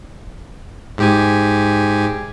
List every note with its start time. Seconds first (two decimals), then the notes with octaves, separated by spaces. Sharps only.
0.98 G#2 G4 G#5